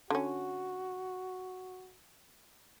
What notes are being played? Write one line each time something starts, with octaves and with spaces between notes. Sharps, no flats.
D3 C#4 F#4